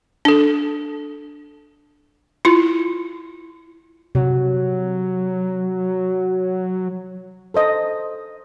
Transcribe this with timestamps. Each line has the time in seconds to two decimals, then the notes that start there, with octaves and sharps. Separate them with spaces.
0.25 D4 A4
2.45 E4 F4
4.15 C3 F#3
7.54 A4 C5 D#5